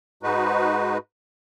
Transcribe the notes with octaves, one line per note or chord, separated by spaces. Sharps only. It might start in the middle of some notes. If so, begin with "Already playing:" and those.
G#2 G#3 D#4 F#4 B4